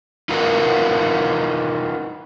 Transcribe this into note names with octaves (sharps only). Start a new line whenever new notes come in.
D#4 F4 F#4 A#4 B4